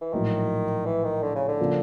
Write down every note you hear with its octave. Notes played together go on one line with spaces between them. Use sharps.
E3
A#1 A2 D#3 F#3
E3
D#3
D3
C#3
D3
C#3 F3 A#3